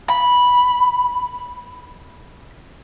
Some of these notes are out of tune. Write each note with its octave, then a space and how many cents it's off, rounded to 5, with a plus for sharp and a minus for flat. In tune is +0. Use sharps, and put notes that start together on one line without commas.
B5 -10